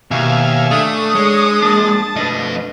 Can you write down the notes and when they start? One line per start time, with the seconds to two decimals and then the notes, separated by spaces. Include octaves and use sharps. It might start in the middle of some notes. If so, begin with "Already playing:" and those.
0.11 D#2 B2 E5 F5 G#5
0.71 A3 D4 D5 D#6
1.15 G#3 C#5
1.62 A#3 D4 A5
2.16 F2 A3 D4 B4 D#5